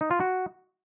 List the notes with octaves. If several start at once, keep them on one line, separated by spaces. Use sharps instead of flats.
D#4
F4
F#4